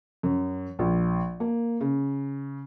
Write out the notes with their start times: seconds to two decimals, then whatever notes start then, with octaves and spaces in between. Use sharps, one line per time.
0.23 F#2
0.79 A#1
1.40 A#3
1.81 C#3